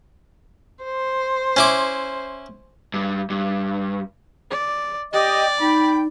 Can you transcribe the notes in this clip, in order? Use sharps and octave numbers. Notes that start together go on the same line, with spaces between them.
C5
C#4 E4 D6
G2
G2
D5
G4 D5 D#5 G5
D#4 G5 B5